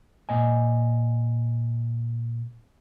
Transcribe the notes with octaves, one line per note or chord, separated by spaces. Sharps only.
A#2 D#5 G#5